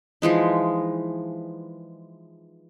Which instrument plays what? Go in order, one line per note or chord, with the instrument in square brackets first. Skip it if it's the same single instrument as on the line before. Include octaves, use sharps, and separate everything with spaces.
[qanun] E3 F3 G#3 D#4